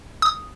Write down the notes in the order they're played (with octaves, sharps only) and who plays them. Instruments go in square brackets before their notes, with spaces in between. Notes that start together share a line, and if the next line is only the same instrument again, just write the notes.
[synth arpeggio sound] D#6